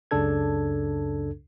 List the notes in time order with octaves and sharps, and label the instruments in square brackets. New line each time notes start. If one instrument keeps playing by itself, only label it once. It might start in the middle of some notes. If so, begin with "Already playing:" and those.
[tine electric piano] C#2 F#2 C#3 D4 A4 G#6